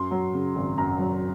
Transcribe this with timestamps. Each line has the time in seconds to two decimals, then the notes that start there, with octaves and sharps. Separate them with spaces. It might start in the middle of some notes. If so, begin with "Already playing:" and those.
Already playing: F#2 C6
0.11 F#3
0.34 C#3
0.56 G#1
0.78 F#2 A#5
0.99 F#3